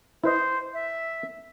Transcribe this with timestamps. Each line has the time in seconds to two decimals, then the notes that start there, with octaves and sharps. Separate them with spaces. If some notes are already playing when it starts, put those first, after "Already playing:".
0.24 E4 B4 C5 D#5
0.74 E5